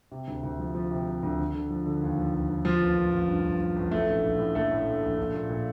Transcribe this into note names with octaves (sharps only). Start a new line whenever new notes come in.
C3
D2
D2
F3
F3
C3
C3
D2
D3
D3
F3
D3
D#2
F3
D#2
D#2
F3 F4
A1
A1
A1
G2
A1
F3
A1
A2 A3 A4
A#1
A#1
A2
A#1 A3 A4
A2
A#1
A#1
A#1
A#2
A#2